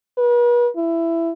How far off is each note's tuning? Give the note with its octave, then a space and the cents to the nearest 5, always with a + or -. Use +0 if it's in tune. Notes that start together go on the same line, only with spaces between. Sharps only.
B4 -40
E4 +15